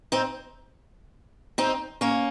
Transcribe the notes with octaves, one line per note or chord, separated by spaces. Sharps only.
C4 D#4
C4 D#4
A#3 C#4